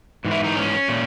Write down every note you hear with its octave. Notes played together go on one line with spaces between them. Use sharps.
G#2 E3
E4
D#4
C#4
A#2